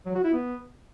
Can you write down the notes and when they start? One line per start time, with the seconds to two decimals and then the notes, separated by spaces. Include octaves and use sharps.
0.06 F#3
0.15 F#4
0.24 E4
0.33 B3